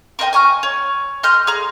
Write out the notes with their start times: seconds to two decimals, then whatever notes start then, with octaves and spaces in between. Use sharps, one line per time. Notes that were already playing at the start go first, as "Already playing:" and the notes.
0.19 A#4 C5 D#5 G5
0.33 G#5 A#5 C#6 F6
0.63 C#5
1.23 D#5 C6 F6 G6
1.47 G#4 A#5